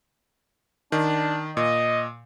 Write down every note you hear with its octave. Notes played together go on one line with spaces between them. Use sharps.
D#3 D4
A#2 D#5